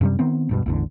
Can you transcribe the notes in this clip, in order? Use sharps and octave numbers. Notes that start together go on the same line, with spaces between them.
F#2 C3 G3
D#3 B3 C4
D1 G2 B2
A1 E2 D3